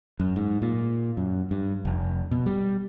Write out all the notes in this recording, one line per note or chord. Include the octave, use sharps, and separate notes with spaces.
F#2
G#2
A#2
F#2
G2
F1
B2
G3